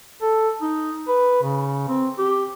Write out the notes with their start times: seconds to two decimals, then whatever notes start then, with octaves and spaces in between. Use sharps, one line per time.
0.22 A4
0.62 D#4
1.08 B4
1.43 C#3
1.88 C4
2.18 G4